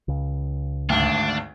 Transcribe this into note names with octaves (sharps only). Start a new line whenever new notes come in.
C#2 C#3
G#1 D2 D4